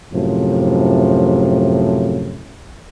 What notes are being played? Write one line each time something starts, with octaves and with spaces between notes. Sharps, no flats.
F#2 A2 C3 F3